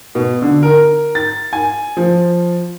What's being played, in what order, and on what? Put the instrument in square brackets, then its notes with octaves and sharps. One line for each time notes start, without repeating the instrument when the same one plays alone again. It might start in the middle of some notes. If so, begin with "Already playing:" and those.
[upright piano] B2
D3
A#4
A6
G#5
F3